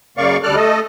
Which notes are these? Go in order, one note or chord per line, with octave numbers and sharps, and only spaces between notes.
F#2 C#3 A#3 D5 F5 C#6
D2 G3 A4 D5 F6 F#6
A3 A4 D#5